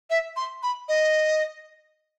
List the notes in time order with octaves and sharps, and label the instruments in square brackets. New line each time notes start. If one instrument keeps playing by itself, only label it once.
[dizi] E5
C6
B5
D#5